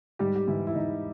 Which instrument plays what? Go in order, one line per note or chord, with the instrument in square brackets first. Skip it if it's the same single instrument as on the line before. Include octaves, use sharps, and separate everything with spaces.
[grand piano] G#2 G3 G4
G4
G#2 E3 E4
E4
G#2 D#4